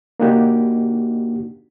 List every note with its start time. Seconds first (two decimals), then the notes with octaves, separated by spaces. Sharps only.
0.20 A#3 D4 D#4 F#4 G4